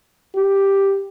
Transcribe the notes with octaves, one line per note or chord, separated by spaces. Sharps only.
G4